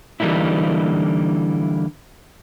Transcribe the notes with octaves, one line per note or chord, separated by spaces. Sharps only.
D3 E3 G3 A#3 D#4 E4